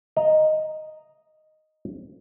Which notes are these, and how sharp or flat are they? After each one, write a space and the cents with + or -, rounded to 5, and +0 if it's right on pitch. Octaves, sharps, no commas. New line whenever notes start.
D#5 +0 A#5 +0